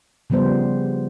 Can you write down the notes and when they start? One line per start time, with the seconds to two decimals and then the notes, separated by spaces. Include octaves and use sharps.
0.30 C#3 F3 G3 B3 C5